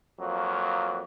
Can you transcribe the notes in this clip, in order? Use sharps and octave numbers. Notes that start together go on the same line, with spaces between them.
F2 F#3 A#3